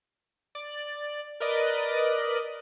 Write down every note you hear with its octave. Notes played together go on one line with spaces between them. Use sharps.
D5
A#4 B4 D5 D#5